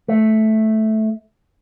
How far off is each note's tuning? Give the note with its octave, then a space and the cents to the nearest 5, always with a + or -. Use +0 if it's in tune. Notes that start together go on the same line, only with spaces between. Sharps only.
A3 -10